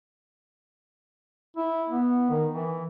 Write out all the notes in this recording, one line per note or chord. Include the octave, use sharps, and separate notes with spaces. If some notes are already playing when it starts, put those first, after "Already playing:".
E4
B3
D#3
E3